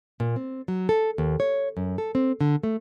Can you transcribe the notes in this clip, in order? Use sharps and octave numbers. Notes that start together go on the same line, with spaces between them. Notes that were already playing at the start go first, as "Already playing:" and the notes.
A#2
C4
F#3
A4
D#2
C#5
F#2
A4
C4
D3
A3